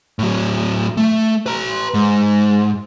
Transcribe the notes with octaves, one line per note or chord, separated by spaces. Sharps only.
A2 F#3
A3
B4 A#5
G#2